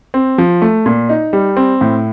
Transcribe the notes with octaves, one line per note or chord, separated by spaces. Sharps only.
C4
F3
A3
A#2
D#4
G3
C4
A2